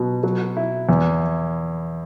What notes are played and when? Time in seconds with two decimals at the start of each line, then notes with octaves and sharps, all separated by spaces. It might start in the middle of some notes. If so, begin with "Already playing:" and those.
Already playing: B2 F#3
0.23 F#3
0.57 E4
0.89 E2